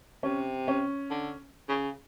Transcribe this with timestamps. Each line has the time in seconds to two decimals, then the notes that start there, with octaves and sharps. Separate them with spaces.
0.23 C3 C#4
0.68 C#4
1.11 D3
1.69 C#3